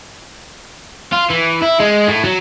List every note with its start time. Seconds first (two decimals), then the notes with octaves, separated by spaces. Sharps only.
1.12 F4
1.30 E3
1.62 E4
1.80 G#3
2.08 A2
2.24 F#3